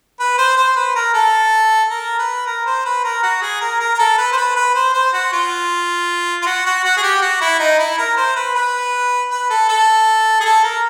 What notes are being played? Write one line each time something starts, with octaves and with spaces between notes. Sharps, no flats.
B4
C5
C5
B4
A#4
A4
A#4
B4
A#4
C5
B4
A#4
F#4
G#4
A#4
A#4
A#4
A4
B4
C5
B4
B4
C5
C5
F#4
F4
F4
F#4
F#4
F#4
G#4
G4
F#4
E4
D#4
E4
A#4
C5
B4
B4
B4
A4
A4
G#4
A4
A#4